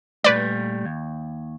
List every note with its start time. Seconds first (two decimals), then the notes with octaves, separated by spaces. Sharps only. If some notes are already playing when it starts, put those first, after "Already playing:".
0.24 A#2 G3 A3 B4 D5
0.85 D#2